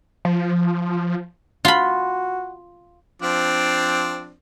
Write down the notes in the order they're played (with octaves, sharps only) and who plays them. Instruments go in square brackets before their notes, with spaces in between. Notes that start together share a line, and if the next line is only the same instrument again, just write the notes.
[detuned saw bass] F3
[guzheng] F4 B5 [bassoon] F#4
[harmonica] F3 C4 D4